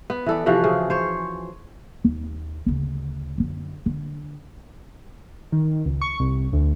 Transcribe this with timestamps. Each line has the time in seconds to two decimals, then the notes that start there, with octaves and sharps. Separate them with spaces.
0.10 B3
0.26 E3 A4 D5
0.46 C3 E3 F3 F#4
0.64 C#3 G#4
0.90 C5 C#5
2.04 D#2
2.66 D2 C#3
3.38 F#2 D3
3.86 D3
5.52 D#3
5.86 C#2
6.01 C#6
6.20 C2
6.53 D2